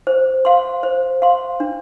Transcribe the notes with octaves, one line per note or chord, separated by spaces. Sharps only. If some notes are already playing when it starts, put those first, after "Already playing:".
C5
F5 C6
C5
F5 C6
D4